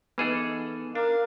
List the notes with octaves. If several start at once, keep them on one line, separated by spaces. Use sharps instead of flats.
E3 B3 D#4 G#4 A4 B4 D#5
D4 A#4 F5